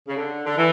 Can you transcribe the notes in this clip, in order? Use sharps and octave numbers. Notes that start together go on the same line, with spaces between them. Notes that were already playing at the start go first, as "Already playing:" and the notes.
C#3
D3
D3
E3